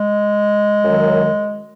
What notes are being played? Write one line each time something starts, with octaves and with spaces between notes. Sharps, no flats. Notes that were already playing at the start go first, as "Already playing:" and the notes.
Already playing: G#3
F#2 D#3 F#3